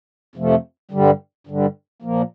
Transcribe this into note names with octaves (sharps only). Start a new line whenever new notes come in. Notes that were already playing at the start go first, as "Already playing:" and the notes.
F2 C3 F3 A3
G2 D3 G3
G2 D3 G3
A#2 F3 A#3